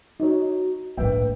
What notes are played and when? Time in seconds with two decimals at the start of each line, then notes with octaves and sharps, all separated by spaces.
0.20 D#4 F#4 C#5
0.97 G1 A2 A#3 B4 E5 G5